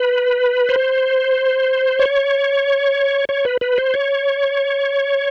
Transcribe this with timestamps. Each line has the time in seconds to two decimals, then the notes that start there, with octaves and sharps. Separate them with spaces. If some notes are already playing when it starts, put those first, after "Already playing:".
Already playing: B4
0.69 C5
1.99 C#5
3.29 C#5
3.45 B4
3.61 B4
3.78 C5
3.94 C#5